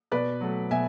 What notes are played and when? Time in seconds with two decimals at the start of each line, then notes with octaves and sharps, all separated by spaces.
0.12 B2 B4 D5
0.41 F#3 A3
0.71 B2 E5 G#5